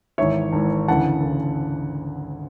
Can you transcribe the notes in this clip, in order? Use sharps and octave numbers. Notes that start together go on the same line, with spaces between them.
G#1 G#2 E3 C#5 E5
G#1 G#2 E3
D2 C#3 E3 F#5 A5
D2 C#3 E3